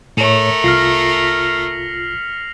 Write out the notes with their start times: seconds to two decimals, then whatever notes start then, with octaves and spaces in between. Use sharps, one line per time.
0.17 A2 A3 A#4 C#5 C#7 F7 F#7
0.64 C2 F4 F6 A#6 C7
1.18 B6